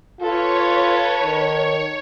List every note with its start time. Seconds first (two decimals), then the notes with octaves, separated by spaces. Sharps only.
0.21 F4 A4 B4 C#5
1.22 D#3